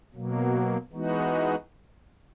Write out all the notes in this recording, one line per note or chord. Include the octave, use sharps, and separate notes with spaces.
B2 F#3 A#3
E3 G#3 B3 D#4 F#4